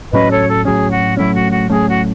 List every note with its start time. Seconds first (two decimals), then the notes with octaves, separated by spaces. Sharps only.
0.13 A2 F#3 C#4 B4 D#5
0.30 A4 C#5
0.49 A4
0.65 A2 F#3 C#4 G#4
0.91 F#4
1.17 A2 F#3 A3 C#4 E4
1.35 F#4
1.52 F#4
1.70 A2 F#3 A3 C#4 G#4
1.87 F#4